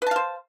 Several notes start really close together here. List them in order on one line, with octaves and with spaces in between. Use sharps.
B4 A5 F5 C5